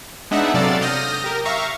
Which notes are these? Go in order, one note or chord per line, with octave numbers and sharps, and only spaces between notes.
G#3 B3 D4 D#4 E5 F#5
C3 F#3 A4 D5 F5 A6
D#6 F6 G6 A#6
G4 A#4
E5 F5 A#5 C#6